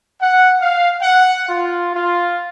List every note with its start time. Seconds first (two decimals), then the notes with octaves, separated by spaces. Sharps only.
0.21 F#5
0.60 F5
1.01 F#5
1.49 F4
1.95 F4